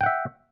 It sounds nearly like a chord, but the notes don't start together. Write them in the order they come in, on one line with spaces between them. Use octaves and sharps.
G5 F#5 E5